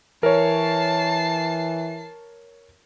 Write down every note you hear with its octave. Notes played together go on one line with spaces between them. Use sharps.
E3 A#4 C#5 A5 C7